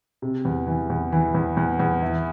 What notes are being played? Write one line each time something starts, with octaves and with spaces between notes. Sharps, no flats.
C3
E2
E3
E2
E3
E2
E2
E2
E4